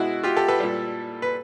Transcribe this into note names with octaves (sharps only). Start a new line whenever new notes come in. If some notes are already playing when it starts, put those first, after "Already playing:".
Already playing: B2 G#3 E4 F#4
F4 G4
G4 A4
A4 B4
A#2 G3
B4